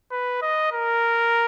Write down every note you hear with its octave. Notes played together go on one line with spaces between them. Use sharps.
B4
D#5
A#4